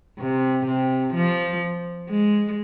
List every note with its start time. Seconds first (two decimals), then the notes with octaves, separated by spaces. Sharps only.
0.19 C3
0.66 C3
1.14 F3
2.09 G#3